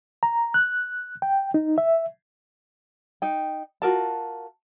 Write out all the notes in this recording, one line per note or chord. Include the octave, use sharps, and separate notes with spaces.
A#5
F#6
G5
D#4
E5
D#4 G5
F4 F#4 A#4 A5